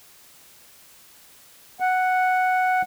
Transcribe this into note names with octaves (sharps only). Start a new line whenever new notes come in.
F#5